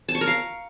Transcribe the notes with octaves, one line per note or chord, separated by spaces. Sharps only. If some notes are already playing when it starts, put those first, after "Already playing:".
A5
C#6
A#4
F5